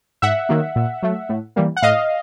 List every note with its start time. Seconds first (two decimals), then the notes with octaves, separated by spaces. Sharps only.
0.22 G#2 E5 F#5
0.49 D#3 F#3 A#3
0.76 A#2
1.02 F#3 A3
1.29 A2
1.56 E3 G3 A#3
1.77 F#5
1.82 A2 D#5 F5